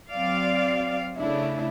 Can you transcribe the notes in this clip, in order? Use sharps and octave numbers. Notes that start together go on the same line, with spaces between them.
F#3 C4 D5 F5
C#3 A3 D4 E4